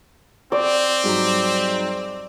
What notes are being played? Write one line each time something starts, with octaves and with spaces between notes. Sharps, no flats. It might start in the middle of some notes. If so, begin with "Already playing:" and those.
C4 D5
G#2 F#3 G3